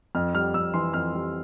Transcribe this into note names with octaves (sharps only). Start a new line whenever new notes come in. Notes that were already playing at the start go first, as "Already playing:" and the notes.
F2 F6
G3 F6
F2 E6
E3 C6
F2 F6
G3